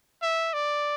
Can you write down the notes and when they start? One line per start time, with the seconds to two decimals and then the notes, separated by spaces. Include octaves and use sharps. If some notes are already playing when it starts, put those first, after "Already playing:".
0.22 E5
0.53 D5